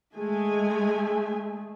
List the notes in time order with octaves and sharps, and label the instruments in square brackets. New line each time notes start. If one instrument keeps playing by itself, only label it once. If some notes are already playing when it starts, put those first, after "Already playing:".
[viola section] G#3 G#5 [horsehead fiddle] A3 G#4